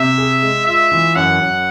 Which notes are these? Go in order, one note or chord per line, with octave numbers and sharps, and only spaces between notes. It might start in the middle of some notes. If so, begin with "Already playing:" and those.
Already playing: C3 E5
G#4
G#3
F4 E5
E3
F#2 F#5
F#2